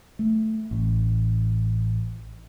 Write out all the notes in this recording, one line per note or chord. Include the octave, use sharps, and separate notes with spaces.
A3
A1